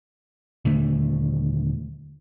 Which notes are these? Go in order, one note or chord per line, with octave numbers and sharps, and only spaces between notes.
D#1 D3 A3